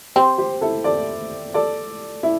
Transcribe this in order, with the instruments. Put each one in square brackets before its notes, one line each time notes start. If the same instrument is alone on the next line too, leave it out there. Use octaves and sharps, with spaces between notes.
[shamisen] C4 [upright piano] G4 C5
[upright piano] G4 C5
E4 A4
A4 D5
A4 D5
E4